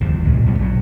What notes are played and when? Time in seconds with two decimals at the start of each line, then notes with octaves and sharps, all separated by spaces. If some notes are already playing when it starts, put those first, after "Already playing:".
0.01 G1 D#2 D#3 F3
0.24 C2 A#2 C#3 G#3
0.46 F#2 B3
0.59 A#1 B2 F#3